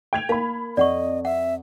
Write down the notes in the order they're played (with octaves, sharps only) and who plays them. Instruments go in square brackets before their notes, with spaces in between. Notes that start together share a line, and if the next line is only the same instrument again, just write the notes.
[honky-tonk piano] G5 G#6 F7
[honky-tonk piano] A#3 B5 [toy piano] F5 A5
[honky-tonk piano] F2 [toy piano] D5 F#5 C#6 [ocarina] D#5
[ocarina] E5 [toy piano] F#5